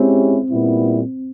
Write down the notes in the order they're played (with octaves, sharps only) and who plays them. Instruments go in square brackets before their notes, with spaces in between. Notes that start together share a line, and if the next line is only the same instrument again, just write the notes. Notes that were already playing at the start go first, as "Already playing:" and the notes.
Already playing: [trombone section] G#3 C#4 E4 G4 [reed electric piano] C4
[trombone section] A#2 G3 B3 E4